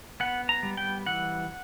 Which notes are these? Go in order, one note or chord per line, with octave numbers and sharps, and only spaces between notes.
B3 F#5
A#5
G3
G5
E3 F#5